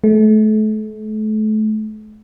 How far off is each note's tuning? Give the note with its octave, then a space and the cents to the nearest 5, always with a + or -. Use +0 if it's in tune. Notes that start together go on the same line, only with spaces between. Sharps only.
A3 -35